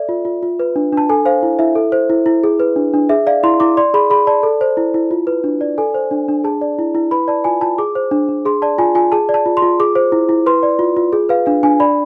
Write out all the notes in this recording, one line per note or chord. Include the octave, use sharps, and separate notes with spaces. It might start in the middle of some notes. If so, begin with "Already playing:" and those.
Already playing: A4 D5 E5
F4
F4
F4
B4
D4
D4
A5
A4 G#5
C5 F5
E4
E4 E5
A4
C5
E4
E4
G#4
B4
D4
D4
G#4 E5
D5 F5
E4 C6
E4 D6
D5 C6
G#4 B5
G#4 B5
D5 A5
A4
C5
E4
E4
F4
B4
D4
D5
A4 G#5
C5
D4
D4
G#4 A5
D5
E4
E4
B4 B5
D5 A5
F4 G#5
F4 A5
G#4 D6
C5
D4
D4
G#4 C6
D5 A5
F4 G#5
F4 G#5
G#4 A5
D5
A5
F4
C6
F4
G#4 D6
C5
E4
E4
B4 C6
D5
F4
F4
G#4
B4 F5
D4 F5
D4 G#5
D5 B5